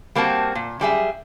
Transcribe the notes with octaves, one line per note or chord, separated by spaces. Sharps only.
G3 A#3 C4 F#4 A5
A#2
F#2 G3 G#4 E5